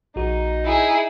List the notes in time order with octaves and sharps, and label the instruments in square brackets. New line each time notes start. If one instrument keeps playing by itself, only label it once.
[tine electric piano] A#1 F#4 [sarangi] D#4
[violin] E4 G#4